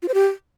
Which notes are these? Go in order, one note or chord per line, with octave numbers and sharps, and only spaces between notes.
F4
C5
G4